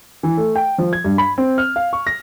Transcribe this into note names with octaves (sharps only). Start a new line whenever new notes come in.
E3
A3
G5
F3
G#6
G2
B5
C4
F6
F5
C#6
A#6